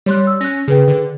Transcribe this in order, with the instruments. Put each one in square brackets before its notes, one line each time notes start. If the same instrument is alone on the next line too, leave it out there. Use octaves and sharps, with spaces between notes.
[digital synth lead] G3 [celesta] C#5 C6 F#6
[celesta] E6
[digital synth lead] C#4 [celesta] F#6 A#6
[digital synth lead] C#3 [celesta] G#4 B4 G5
[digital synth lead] D3